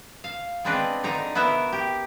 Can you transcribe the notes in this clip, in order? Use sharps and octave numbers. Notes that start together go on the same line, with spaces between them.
F5
G#3 B3 C4 D4 B4 C5
D3 D#4 A#5
B3 E4 F#4 A#4 E5
G4